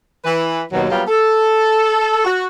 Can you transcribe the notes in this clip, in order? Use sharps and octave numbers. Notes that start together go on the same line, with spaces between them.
E3 B4
D#2 B2 F#3
F#3 G3 A#3 B3 F4 G4
A4
F#4